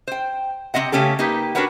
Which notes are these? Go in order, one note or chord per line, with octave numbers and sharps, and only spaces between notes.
C5 G5
C3 A#3 C4 D#5 F#5
C#3 A3 C#4 G4 A4
A#3 D#4 G4 B4
D4 F#4 A#4 B4 C#5 F#5